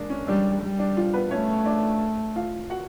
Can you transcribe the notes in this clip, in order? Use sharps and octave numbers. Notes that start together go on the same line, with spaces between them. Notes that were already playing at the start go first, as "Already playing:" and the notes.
Already playing: G#3 A#3 D4 G#4
C#4
G3 D4
G3
D4
F3 F4
B3 B4
A3 C#4 C#5
D4 D5
F4 F5
F#4 F#5